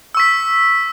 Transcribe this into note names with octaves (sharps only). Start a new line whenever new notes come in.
C#6 E6 B6